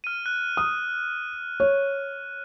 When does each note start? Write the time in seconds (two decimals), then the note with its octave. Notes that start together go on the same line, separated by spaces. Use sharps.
0.04 F6 D#7
0.26 F#6
0.57 D#6
1.60 C#5